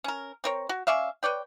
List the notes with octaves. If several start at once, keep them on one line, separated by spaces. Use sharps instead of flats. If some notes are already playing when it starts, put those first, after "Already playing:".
C#4 A#4
C4 A#4 C#5
F#4
C#4 D5 E5 F5
B4 C#5 D5 G5